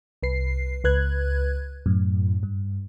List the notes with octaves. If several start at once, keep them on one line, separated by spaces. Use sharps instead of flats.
C2 B4 C7
C#2 B4 F#6 G#6
F#2 A2
G2